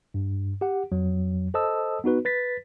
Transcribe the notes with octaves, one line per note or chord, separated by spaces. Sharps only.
G2
G4 F#5
F2 F#3
A4 C5 D#5 A5 D#6 E6
B3 D#4 F#4 B4
B4 A6 B6